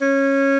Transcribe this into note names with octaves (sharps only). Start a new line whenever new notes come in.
C#4